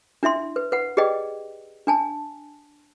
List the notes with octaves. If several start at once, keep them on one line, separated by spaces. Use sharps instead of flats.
D4 E4 E5 C6
B4
B4 F#5
G4 G#4 B4 D5 D#5 G5
D4 G#5 A5